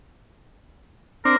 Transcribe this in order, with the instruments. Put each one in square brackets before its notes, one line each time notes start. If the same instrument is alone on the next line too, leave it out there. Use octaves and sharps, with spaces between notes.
[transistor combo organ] C4 D4 [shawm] A#4